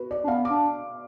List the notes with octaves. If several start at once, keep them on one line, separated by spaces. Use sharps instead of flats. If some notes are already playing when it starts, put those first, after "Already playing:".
Already playing: F#4 B4
D5
D4
B3 F5
D4 D6